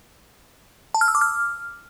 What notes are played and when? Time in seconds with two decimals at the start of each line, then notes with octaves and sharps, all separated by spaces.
0.94 A5
1.01 F6
1.08 E6
1.15 D6
1.21 F6